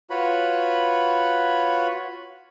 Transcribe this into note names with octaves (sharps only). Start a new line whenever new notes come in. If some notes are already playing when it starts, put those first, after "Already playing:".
F4 F#4 B4 C#5 B5